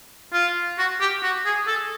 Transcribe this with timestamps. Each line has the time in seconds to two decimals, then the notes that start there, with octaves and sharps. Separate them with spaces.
0.33 F4
0.78 F#4
1.01 G4
1.23 F#4
1.46 G#4
1.68 A4